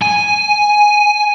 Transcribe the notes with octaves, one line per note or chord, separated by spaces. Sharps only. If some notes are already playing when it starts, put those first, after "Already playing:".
G#5